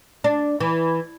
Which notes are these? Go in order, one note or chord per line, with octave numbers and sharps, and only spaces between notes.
D4
E3